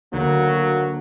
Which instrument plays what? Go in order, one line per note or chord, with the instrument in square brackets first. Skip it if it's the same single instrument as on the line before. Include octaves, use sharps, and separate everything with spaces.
[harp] D2 G6 [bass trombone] F#3 [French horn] A#3